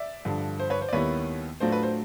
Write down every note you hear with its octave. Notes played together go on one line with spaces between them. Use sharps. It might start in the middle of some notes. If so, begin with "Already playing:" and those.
Already playing: D5 E5
G2 D3 F3
C5
B4 C#5
C5
D5
D#2 D#3 G3 B3 E4 B4 C#5
A2 F#3 A3 D4 F4 C5
B4
C5